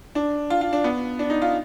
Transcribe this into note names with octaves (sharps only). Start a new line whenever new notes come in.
D4
F4
F4
D4
B3
D4
D#4
F4